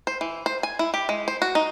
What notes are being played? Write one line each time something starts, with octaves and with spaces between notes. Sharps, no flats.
C5
E3
C5
G#5
E4
G4
G#3
C5
F#4
D#4